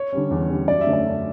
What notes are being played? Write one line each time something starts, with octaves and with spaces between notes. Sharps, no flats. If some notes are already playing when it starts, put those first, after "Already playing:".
Already playing: C#5
D3 G3 C#4
E2
D3 G3 C#4
F#2 D5
E5
D3 A3 C#4
D5
F#2